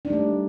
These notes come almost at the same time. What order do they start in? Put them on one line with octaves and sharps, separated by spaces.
D4 D#4 G3 A3